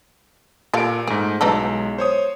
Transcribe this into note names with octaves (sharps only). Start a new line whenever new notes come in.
A#2 G4 A4 F5 D7
G#2 A3 G#4
B1 E3 G#3 D#4 A4
C5 C#5 D#6